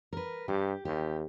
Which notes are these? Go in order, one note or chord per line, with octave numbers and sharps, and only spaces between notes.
A#4 B4
G2 G4
D#2 G4